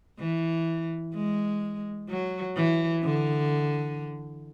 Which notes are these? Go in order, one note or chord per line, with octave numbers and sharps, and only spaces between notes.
E3
G#3
F#3
E3
D3